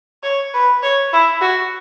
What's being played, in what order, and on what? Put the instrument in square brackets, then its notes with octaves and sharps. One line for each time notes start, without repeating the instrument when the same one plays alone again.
[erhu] C#5
B4
C#5
E4
F#4